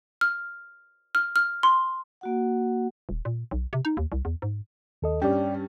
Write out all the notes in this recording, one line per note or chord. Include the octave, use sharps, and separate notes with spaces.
F6
F6
F6
C6
A#3 F#4 F#5
D#1
A#2
B1
C3
D#4
D#2
C2
E2
G#2
D#2 A4 D#5
G2 G3 C#4 D5 G5